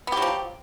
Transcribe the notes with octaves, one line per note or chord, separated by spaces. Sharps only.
F3 F#3 B3 G4